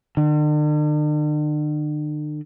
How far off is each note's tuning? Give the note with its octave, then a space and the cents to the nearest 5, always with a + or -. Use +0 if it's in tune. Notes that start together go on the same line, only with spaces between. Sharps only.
D3 +45